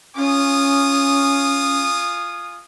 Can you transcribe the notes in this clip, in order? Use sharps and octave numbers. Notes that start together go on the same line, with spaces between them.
C#4 F4 G#5 D#6